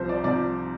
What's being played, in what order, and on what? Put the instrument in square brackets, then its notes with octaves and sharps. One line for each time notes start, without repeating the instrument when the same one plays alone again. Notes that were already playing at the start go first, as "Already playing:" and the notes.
Already playing: [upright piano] C2 C3 F3 C5
D5
C2 C3 F3 D5